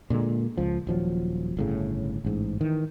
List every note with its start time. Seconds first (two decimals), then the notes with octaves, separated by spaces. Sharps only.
0.10 A#2 D3 F3 G#3
0.57 C#2 F3
0.87 D#1 F3 F#3
1.57 G1 A2 C#3
2.25 A1 G#2
2.61 D#3 E3